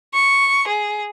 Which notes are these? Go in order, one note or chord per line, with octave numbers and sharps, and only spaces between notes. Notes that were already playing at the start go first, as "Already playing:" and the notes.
C#6
G#4